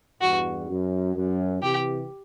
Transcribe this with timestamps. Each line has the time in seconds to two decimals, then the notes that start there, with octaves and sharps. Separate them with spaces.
0.21 E2 G2 F#4
0.69 F#2
1.16 F#2
1.62 C3 E3 G4